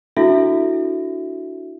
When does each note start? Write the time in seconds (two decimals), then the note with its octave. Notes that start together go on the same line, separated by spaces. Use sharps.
0.17 D4 E4 F#4 A4 E5